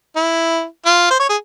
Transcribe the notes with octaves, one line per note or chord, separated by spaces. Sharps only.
E4
F4
C5
C#5
G#4